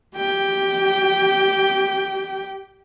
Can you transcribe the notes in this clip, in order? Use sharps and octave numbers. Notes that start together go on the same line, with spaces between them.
G4 G5